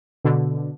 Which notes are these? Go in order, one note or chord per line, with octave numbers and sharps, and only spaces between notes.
B2 D3